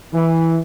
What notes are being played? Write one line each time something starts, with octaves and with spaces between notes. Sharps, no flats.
E3